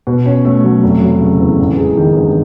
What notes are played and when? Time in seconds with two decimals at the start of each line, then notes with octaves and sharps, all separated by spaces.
0.07 B2
0.26 C#4
0.45 A3
0.64 F#3
0.83 F1
1.02 F#3
1.20 C#3
1.40 E2
1.59 A1
1.77 G#3
1.97 D#3
2.16 G2